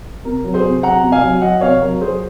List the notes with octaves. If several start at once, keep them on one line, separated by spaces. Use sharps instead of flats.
C3 A#4
F#3
G#4 C5
C3
F#3 F#5 A#5
C3
F5 G#5
F#3
F#3 D#5 F#5
C3 C#5 F5
F#3 A#4
F#3 G#4 C5